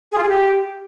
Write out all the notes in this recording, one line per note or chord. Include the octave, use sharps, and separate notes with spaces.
G#4
F4
G#4
G4